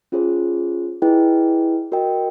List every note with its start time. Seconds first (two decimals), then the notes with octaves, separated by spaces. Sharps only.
0.12 C#4 F4 G#4 C5
1.02 E4 G#4 B4 D#5 G5
1.92 F#4 A#4 D#5 G5